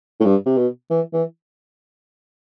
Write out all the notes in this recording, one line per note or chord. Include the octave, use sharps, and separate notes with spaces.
A2
G2
C3
B2
E3
E3